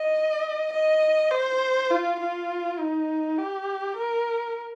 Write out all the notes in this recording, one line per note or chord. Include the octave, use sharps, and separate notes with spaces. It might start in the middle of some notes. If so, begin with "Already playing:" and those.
Already playing: D#5
D#5
C5
F4
F4
D#4
G4
A#4